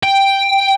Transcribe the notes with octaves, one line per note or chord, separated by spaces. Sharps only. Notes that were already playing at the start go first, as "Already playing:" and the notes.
G5